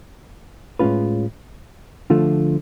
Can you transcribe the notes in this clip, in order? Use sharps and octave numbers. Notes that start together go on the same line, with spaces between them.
A2 G#3 C#4 F4 B4
D3 F3 A3 F4